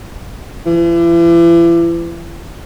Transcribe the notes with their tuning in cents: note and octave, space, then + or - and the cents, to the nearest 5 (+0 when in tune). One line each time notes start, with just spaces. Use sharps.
E3 +40